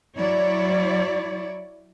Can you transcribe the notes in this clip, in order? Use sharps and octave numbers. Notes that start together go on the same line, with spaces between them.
F#3 E4 C#5 D5